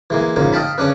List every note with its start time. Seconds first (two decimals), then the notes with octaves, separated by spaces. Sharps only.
0.10 E3 G#3 A#3
0.36 A#1 G#2 C#3 A#3
0.53 D#5 F5 G5 A5 B5
0.78 C#3 C#4 D4 B4